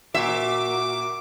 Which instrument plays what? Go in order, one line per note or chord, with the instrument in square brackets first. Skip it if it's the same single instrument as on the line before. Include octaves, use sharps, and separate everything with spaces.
[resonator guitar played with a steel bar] A#2 [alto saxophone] F#4 [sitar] E5 [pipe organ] D6